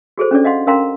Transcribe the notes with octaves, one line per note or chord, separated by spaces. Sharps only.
F#4 G#4 A4 C5
C#4 D4 A4 D5
D#5 F5 F#5 C6
C#4 A#4 F5 G5 A#5 C6